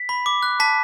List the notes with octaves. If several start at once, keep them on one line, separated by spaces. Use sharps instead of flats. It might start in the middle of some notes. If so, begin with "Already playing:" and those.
Already playing: B6
B5
D6
F#6
A5 B6